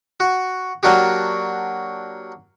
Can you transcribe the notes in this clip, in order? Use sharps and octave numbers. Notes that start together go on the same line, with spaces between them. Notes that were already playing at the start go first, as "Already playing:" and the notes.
F#4
F#3 A#3 D4 F#4 G4